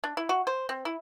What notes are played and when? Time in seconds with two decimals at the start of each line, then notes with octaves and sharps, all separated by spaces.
0.04 D4
0.17 E4
0.29 F#4
0.47 C5
0.69 C4
0.85 E4